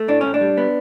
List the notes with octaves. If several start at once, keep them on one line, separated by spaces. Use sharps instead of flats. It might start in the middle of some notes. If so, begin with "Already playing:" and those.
Already playing: A3
A2 D4
A2 C#4
D4
G3
B3